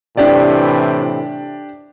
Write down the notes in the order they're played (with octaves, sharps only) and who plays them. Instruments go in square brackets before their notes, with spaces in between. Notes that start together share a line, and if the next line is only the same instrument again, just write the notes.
[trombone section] A2 C3 E3 [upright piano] D4 G4 D5